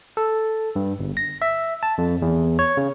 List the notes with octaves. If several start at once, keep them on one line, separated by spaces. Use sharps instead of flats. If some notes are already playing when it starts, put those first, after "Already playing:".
A4
G2
G1
A#6
E5
A5
F2
E2
C#5
C#3